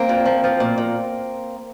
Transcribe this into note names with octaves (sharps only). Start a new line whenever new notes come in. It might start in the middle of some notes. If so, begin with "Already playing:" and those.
Already playing: A#3 C4
A#2
F3
F3
A#2
A#2